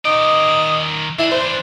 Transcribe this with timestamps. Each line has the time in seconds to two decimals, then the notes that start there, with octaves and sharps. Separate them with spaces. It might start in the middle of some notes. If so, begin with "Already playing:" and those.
0.05 D#3 D5 D#5
1.19 E3 D4 E4
1.31 C5